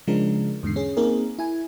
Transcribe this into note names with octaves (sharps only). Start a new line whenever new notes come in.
C#3 F3 G#3 D4 A#4
E2 G#2 D3 C7
C#4 G#4
A#3 C4 D#4 G#4 A#4
E4 G#5